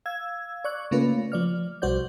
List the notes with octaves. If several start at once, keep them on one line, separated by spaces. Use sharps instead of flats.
F5 E6 G#6
D5 C#6 F#6
C#3 A3 A#3 C#4 F4 B4
F3 D5 F6
B1 G3 F#4 C5 D5 G6